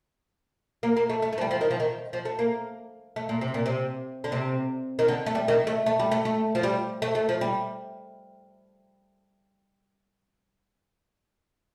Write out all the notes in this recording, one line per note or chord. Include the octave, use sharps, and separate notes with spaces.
A#3
A#3
A3
A3
A3
F3
G3
F3
D#3
F3
D#3
F3
A3
A#3
A3
A#2
C3
A#2
C3
D3
C3
D#3
D3
A3
G3
D#3
A3
A3
G3
A3
A3
F3
G3
A3
A3
F3
G3